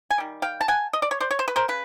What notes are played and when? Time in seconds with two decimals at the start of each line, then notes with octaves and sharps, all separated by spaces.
0.10 G#5
0.18 D#3 G3
0.42 F5 G5
0.61 A5
0.68 F#5 G#5
0.93 D#5
1.02 D5
1.11 C#5
1.20 C5 D5
1.31 C#5
1.39 C5
1.48 B4
1.56 A#4 C5
1.68 C#3 B4